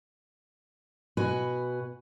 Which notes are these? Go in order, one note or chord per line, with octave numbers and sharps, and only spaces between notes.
B2 F#4 B4 G#5